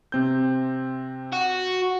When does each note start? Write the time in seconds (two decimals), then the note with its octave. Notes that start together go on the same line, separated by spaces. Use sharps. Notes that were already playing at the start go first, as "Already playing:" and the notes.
0.12 C3 C4 G6
1.32 F#4